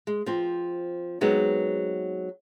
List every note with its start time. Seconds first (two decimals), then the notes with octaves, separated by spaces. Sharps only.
0.07 G#3
0.26 F3 C4
1.21 F#3 G#3 B3 C4 D#4